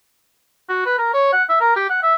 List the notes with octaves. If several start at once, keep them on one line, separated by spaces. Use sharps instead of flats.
F#4
B4
A#4
C#5
F#5
E5
A#4
G4
F#5
E5